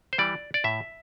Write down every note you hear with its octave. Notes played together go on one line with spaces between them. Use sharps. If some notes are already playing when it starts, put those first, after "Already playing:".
C5
E3 G3 D5
D5
A2 E5